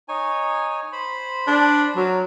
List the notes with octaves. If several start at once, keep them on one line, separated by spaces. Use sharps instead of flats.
D#4 C#5 G#5
C5 B5
D4
F#3 A#4